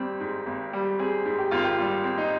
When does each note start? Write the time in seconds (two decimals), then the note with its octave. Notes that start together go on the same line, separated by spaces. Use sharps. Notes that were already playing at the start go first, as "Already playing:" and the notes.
Already playing: G#1 G3 C4
0.20 G#2
0.46 G#1
0.73 G3
0.99 C4 G#4
1.25 G#2
1.38 G4
1.51 G#1 F4
1.64 G4
1.78 G3 F4
2.04 C4
2.18 D#4